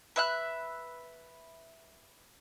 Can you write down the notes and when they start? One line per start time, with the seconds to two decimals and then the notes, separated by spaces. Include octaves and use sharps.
0.16 B4 E5 F#6